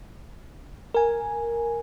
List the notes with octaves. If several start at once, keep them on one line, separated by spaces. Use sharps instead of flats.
A#4 G#5